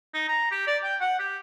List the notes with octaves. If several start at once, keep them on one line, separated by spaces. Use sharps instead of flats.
D#4
A#5
G4
D5
G5
F#5
G4